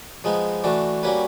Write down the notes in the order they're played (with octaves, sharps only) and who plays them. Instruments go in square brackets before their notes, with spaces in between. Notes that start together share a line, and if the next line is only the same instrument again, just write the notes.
[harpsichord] F3 G#3 B3 D#4
E3 A3 D4 F#4
G3 A#3 C#4 F#4 B4